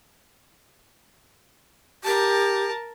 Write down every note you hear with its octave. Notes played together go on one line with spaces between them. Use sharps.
G4 A#4 A5